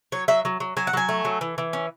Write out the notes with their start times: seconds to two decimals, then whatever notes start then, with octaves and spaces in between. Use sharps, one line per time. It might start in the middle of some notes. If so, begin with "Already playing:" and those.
0.12 F#3 C#5
0.28 F#3 E5
0.45 F#3
0.60 F#3
0.77 F#3 G#5
0.87 F#5
0.93 F#3 G#5
1.09 A3
1.25 F#3
1.41 E3
1.58 E3
1.73 C#4